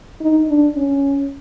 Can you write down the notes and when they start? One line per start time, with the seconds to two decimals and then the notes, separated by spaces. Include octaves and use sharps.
0.21 D#4
0.49 D4
0.77 C#4